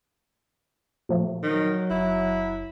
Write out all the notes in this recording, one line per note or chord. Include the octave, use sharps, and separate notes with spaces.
A#2 F3 A3
D#3 F#3
F#1 E4